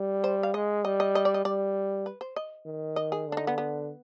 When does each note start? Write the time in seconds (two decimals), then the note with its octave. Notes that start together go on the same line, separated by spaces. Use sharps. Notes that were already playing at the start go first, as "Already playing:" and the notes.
Already playing: G3
0.24 C5
0.43 F5
0.54 G#3 D#5
0.84 G3 D#5
1.00 D#5
1.15 D#5
1.25 D5
1.34 D#5
1.45 G3 D5
2.06 B4
2.21 C5
2.36 D#5
2.66 D#3
2.96 D#5
3.12 G#4
3.28 D3 D4
3.37 D#4
3.47 B3
3.58 B3